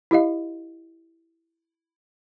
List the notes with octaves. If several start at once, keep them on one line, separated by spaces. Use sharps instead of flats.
E4 G4 D#5 F5